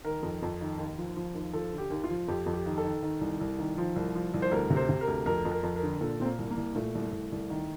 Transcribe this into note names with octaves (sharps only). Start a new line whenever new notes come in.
D#3 A#4
F2
F2
D#3
D#2
F3
F3
D#2
F3 A4
D3
G4
D#2
F4
F3
F2 G4
F2
G4
D#3
A4
D#3
D#3
C2
C2
D#3
F3
C2
F3
C2
C5
D2 A#4
C3
C5
C3
A#4
D2
F2 A#4
F2
A#4
F2
A#4
D3
A#2 A4
A#2 C4
A#3
C2
A#3
C2
A#2 A3
C2
C2
C2
D#3